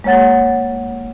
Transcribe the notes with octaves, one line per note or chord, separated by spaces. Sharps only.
G#3 A#3 C#5 F#5 A6